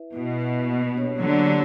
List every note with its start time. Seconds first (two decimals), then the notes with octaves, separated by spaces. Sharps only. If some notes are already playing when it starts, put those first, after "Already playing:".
Already playing: E4 B4 E5
0.13 B2 E4
0.40 B4 E5
0.66 A#3
0.93 D4 G4 C#5
1.19 D3 F#3 A#3
1.47 D4 G4 C#5